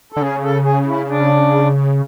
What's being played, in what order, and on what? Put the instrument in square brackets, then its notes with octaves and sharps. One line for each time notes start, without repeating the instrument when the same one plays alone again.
[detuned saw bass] D3 [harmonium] A4
[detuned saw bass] C#3 [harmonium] G#4
[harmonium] A4
G#4
E4
D4